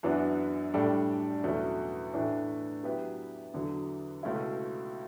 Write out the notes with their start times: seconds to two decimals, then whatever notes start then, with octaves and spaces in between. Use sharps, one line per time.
0.03 F#2 E3 B3 D4 F#4
0.74 A2 G3 D4 A4 D5
1.44 E2 B2 F#3 A3 C#4
2.13 A2 E3 A3 D4
2.83 F#3 B3 E4 G4 B4
3.54 E2 D3 F#3
4.23 C#2 B2 A3 C#4 E4